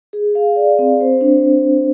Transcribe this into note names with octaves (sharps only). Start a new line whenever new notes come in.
G#4
F5
D5
C4
C5
D4